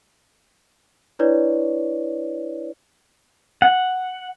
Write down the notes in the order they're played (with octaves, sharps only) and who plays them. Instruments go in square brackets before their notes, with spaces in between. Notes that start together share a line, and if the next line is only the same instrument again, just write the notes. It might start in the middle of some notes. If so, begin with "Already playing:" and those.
[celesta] D4 E4 B4 C#5 D5
[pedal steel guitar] F#5